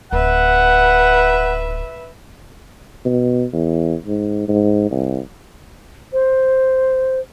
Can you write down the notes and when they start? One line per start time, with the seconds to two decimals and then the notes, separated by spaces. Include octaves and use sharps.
0.12 D1 B4 E5 F#5
3.05 B2
3.53 E2
4.06 G#2
4.48 G#2
4.91 C2
6.13 C5